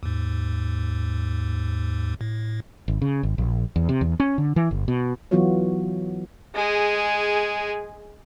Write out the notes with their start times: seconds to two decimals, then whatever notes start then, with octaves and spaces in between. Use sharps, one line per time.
0.03 D#2 G#2
2.21 A2
2.88 G#1
3.02 C#3
3.23 G#1
3.38 A#1
3.76 E2
3.89 C3
4.01 E2
4.20 C#4
4.38 D3
4.56 E3
4.71 G1
4.88 B2
5.31 E3 F#3 B3 F4 F#4 C#5
6.55 G#3 G#4